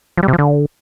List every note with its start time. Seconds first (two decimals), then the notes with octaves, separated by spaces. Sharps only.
0.17 F3
0.23 G3
0.28 C3
0.33 F3
0.38 D3